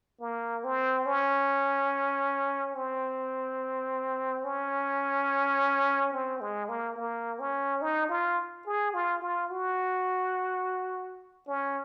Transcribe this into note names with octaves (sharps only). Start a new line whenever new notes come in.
A#3
C4
C#4
C4
C#4
C4
G#3
A#3
A#3
C#4
D#4
F4
G#4
F4
F4
F#4
C#4